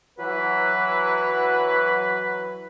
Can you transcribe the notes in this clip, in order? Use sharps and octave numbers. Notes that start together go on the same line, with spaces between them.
E3 F#3 B4